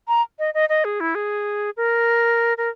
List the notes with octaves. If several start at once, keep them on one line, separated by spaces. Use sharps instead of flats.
A#5
D#5
D#5
D#5
G#4
E4
G#4
A#4
A#4